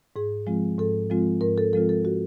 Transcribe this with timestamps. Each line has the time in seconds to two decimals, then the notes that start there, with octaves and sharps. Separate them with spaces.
0.16 G#2 G#4
0.47 F3 G#3 C4 F4
0.78 G#2 A4
1.10 F3 G#3 C4 F4
1.41 G#2 A#4
1.58 A4
1.73 F3 G#3 C4 F4 A4
1.89 A4
2.05 F#4